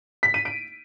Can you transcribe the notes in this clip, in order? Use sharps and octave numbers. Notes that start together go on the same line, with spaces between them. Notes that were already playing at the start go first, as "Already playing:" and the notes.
B6
D#7
D7